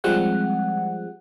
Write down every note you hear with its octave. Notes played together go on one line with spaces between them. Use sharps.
F3 G3 G#3 C4 F#5